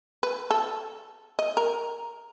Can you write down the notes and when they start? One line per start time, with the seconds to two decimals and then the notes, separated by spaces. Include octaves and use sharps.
0.23 B4
0.50 A4
1.39 D#5
1.57 A#4